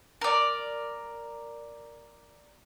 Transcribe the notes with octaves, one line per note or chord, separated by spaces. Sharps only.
A#4 D5